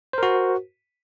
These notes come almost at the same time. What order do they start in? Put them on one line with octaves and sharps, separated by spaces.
C5 A#4 F#4